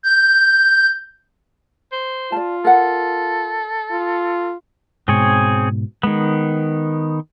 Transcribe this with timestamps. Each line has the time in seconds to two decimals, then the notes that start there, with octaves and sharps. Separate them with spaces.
0.03 G6
1.92 C5
2.32 F4 D5 A5
2.65 A4 A#4 F#5
3.91 F4
5.08 G#2 B2 C4 G#4 C#5
6.03 D#3 G#3 B3